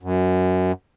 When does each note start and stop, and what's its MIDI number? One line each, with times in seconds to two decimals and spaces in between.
0.03 0.72 42